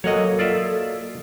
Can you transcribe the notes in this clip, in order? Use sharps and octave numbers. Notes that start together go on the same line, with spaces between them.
F#3 A#3 A4 C#5 D#5 F#5 G#5
F4 D5 E5